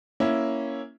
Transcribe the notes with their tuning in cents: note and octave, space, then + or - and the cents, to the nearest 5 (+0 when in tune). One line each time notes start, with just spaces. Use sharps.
A#3 +0 C#4 +0 E4 +0